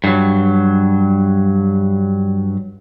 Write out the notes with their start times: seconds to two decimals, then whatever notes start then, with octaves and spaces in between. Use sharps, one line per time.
0.04 G2 F#3